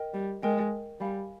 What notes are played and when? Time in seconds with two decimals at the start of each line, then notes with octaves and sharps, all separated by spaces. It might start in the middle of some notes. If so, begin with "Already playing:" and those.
Already playing: A#4 D#5 G5
0.14 G3
0.43 G#3 A#4 D#5 G5
1.00 G3 F5 G#5 B5